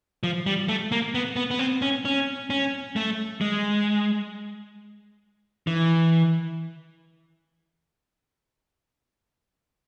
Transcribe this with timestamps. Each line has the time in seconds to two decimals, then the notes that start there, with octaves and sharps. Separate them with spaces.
0.23 F3
0.46 G3
0.69 A3
0.92 A#3
1.15 B3
1.36 B3
1.51 B3
1.59 C4
1.82 C#4
2.05 C#4
2.50 C#4
2.96 A3
3.41 G#3
5.67 E3